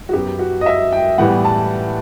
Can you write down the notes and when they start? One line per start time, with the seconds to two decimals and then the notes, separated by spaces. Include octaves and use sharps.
0.09 F#4
0.13 F#2 F#3 B3 G4
0.39 F#4
0.61 D#5
0.66 E5
0.93 G5
1.18 A2 E3 G3 B3 F#5
1.45 A5